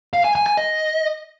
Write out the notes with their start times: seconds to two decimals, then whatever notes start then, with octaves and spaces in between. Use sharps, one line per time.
0.13 F5
0.24 G#5
0.35 G#5
0.46 G#5
0.57 D#5